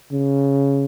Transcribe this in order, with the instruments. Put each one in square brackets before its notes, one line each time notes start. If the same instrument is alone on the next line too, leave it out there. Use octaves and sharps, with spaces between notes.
[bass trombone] C#3